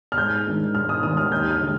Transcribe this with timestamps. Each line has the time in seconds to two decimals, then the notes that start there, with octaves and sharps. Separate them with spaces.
0.12 F6
0.18 G#2 G6
0.45 D#3 G#3 D4
0.75 G#2 F6
0.89 D#6
1.03 D#3 G#3 D4 D#6
1.17 F6
1.31 D#2 G6
1.50 F6
1.60 D3 G#3 D#4